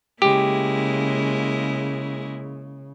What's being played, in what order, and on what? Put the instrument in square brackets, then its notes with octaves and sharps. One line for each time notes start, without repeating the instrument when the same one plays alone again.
[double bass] C#3 [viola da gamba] G#3 A#3 E4 [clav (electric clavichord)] G4